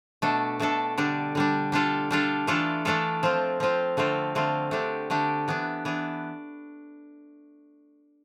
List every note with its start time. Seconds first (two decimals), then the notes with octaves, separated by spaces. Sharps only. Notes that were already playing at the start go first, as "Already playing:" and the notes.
0.22 B2 A3 D4 A4
0.60 B2 A3 D4 A4
0.98 D3 G3 D4
1.35 D3 G3 D4
1.72 G3 D4 F4 A4
2.11 G3 D4 F4 A4
2.47 E3 A3 D4 F4 A4
2.85 E3 A3 D4 F4 A4
3.23 F3 C4 F4
3.60 F3 C4 F4
3.97 D3 A3 C4 F4
4.35 D3 A3 C4 F4
4.71 D3 A3 D4 G4
5.10 D3 A3 D4 G4
5.48 E3 B3 D4
5.85 E3 B3 D4